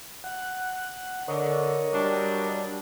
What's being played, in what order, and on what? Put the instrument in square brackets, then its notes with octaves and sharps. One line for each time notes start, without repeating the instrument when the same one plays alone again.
[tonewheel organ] F#5
[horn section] D3 [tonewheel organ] A#4 C#5 D#5
[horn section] F#3 G3 D4